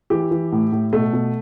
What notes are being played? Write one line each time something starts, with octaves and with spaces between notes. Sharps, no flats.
E3 G4
E3
A2
A2
B2 A3
B2